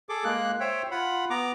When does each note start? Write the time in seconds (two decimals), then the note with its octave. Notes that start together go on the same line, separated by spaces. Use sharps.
0.09 G#4 A4 D6
0.24 G#3 A#3 F#6
0.60 C5 C#5 E5 G5
0.91 F4 F#5 B5
1.30 B3 A#5 D6